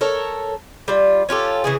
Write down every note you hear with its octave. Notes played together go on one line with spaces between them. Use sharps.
A4 A#4 C#5
G3 F4
C#4 F4 G4 A4
C#3 E3 G#4